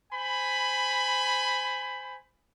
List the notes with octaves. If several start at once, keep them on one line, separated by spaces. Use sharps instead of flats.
C5 G#5 B5